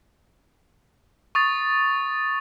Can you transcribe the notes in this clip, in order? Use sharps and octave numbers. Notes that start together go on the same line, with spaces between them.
C#6 D#6 A6